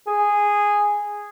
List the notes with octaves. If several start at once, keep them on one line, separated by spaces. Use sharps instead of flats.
G#4